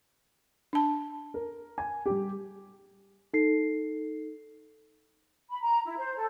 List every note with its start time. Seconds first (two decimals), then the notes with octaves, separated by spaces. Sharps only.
0.73 D4 A5
1.34 A#4
1.78 G#5
2.06 G3 G4
3.34 D#4 A4 C7
5.49 B5
5.62 A#5
5.85 E4
5.98 C5
6.16 A4